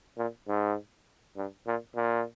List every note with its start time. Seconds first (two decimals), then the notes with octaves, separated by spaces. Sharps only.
0.18 A#2
0.48 G#2
1.36 G2
1.67 A#2
1.96 A#2